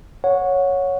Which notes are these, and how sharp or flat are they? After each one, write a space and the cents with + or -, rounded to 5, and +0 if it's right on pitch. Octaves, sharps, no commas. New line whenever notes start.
C#5 +0 F#5 -20